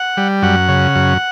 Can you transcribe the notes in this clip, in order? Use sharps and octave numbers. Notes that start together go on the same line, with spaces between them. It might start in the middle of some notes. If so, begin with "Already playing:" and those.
Already playing: F#5
G3
F#2 F#5
C#3
F#2